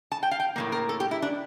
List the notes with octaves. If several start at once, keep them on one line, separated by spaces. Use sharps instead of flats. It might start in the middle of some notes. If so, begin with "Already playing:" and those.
A5
G5
F5
G5
A2 G3 A#3
A#4
A4
G4
E4
D4